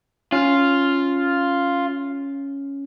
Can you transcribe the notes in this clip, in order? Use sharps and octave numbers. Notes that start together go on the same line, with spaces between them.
C#4 F4